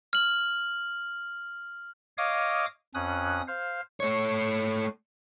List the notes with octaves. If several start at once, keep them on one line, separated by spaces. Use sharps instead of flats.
F6 F#7
C#5 D#5 F5 D6 D#6
F2 C#4 D#6 F#6
C5 F5
A3 C#5